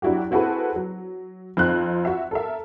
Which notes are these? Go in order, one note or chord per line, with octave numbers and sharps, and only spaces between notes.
F#3 D4 E4 F#4 G4
C4 E4 F#4 G#4 A4 B4
F#3
F2 C4 D#4 F#6
F#4 E5
A4 A#4 E5